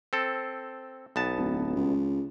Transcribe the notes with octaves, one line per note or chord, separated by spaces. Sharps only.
C4 A4
B1 B3 A5
D1
C#2